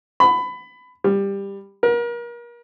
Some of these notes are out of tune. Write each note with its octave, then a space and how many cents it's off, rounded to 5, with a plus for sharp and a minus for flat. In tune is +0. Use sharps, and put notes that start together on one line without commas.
B5 +20
G3 +15
A#4 +35